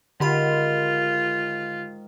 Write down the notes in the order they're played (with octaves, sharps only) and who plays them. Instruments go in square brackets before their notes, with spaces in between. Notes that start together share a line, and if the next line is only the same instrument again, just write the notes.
[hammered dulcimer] G#2 D#3 F#5 [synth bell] D3 G4 B5 [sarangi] F4